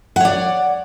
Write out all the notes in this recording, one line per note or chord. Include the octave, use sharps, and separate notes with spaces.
C#5 D5 F#5